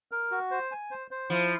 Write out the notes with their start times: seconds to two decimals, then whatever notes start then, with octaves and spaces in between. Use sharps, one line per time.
0.12 A#4
0.31 F#4
0.51 C5
0.72 G#5
0.91 C5
1.11 C5
1.30 F3 E4